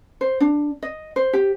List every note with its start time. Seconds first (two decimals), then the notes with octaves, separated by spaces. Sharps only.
0.21 C5
0.40 D4
0.83 D#5
1.16 C5
1.33 G4